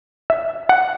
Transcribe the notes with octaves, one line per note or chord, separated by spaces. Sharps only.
E5
F#5